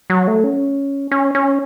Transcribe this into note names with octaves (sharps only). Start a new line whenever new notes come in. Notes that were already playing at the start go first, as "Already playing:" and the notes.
F#3
A3
C#4
C#4
C#4